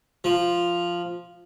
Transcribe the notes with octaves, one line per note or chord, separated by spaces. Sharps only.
F3